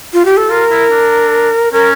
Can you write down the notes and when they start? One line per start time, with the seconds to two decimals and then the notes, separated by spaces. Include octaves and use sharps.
0.14 F4
0.25 G4
0.37 A4
0.50 F4 A#4
0.71 E4
0.91 D4
1.73 C#4 A#4